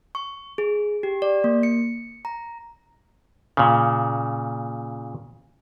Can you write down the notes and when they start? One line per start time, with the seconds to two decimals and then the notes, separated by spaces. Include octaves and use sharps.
0.15 C#6
0.58 G#4
1.03 G4
1.22 D5
1.44 A#3
1.63 C#7
2.25 A#5
3.57 A#2 C#3